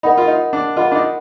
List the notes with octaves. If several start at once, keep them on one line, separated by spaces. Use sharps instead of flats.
D#4 A#4 D#5 F#5 B5
F4
D#4
D4
F4 A#4 D#5 F#5 B5
D4
D#4